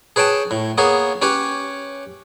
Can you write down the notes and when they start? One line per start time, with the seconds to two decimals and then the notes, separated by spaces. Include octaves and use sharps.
0.16 G#4 B4 C#5 G5 A5
0.51 A2
0.78 A#3 B3 G#4 C#5
1.22 C#4 G4 B4 C#5